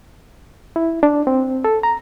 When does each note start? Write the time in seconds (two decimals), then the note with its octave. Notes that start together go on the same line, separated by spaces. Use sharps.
0.76 E4
1.03 D4
1.27 C4
1.64 A4
1.83 A#5